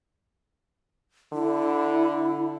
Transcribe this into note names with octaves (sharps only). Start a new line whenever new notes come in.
D3 E4